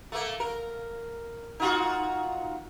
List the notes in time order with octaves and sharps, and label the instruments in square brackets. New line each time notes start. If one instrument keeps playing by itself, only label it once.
[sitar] A3 A#3
A#4
D#4 F4 F#4